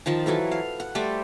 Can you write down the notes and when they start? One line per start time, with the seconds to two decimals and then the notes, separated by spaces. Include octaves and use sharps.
0.06 D#3 F3 A5
0.26 E3 F#3 A4 B4
0.52 F5
0.80 F#5
0.95 G3 A3 A4 C5